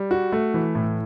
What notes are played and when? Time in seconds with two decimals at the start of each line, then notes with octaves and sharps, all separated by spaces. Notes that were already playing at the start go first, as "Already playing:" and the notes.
Already playing: G3
0.11 F#4
0.32 A3
0.54 E3
0.75 A2